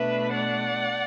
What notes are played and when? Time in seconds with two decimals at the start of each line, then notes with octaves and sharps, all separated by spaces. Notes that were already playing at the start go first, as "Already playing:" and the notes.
Already playing: B2 A3 D4 B4 E5
0.34 D5 F#5